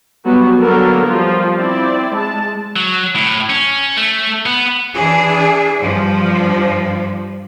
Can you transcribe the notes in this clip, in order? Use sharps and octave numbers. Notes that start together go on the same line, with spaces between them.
F#3 G3 B3 F#4
D3 F#3 A#3 B3 A4 A#4
F3 G3 F4
C4 E4 D5
G#3 A5
F#3
A2
C#4
A3
B3
E3 D4 G#4
G2 F3